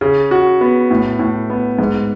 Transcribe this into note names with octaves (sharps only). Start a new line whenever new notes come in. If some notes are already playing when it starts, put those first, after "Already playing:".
C#3
F#4
B3
A2
A2
B3
G#2